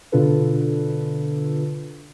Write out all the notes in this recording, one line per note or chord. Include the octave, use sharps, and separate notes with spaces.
B2 D3 D4 F4 A4 B4